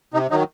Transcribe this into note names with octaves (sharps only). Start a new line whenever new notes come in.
C3 D#4
D#3 F#3 D#4